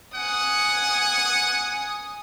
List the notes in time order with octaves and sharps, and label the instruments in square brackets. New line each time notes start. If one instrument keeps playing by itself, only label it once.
[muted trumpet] F#5 [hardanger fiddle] G#5 D#6